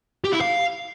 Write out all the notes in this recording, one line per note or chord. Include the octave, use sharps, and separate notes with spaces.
G4
E4
F5